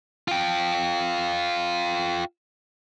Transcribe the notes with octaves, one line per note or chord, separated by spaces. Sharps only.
F4 G5